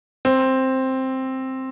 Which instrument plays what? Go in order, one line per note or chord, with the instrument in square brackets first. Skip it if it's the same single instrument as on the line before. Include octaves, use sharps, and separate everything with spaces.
[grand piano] C4